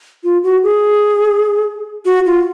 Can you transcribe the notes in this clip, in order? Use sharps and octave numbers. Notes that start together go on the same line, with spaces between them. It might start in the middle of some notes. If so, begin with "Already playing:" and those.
F4
F#4
G#4
F#4
F4